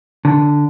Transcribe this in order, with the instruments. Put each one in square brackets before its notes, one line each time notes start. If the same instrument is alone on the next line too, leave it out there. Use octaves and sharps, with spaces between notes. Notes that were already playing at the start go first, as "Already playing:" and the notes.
[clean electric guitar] D3